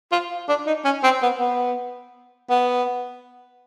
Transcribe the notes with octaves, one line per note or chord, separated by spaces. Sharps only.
F4
D4
D#4
C#4
C4
B3
B3
B3